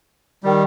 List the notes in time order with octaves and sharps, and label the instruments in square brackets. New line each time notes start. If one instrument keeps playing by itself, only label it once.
[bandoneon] D#3 G3